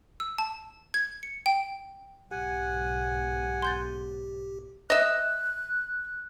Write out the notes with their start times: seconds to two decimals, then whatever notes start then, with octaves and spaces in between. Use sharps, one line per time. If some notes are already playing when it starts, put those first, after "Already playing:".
0.20 E6
0.38 A5
0.94 G#6
1.23 C#7
1.46 G5
2.31 B1 G#2 G4 F#5 G#5
3.62 C6 G6 A6
4.90 D#5 E5 F#6